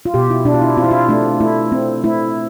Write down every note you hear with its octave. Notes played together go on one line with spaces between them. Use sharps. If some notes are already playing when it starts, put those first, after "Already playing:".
F4
B2 G4
E4
B2 D4
F4
E4
C4 F4
E4
F4
A3 D4
A3 E4
C4
A3 E4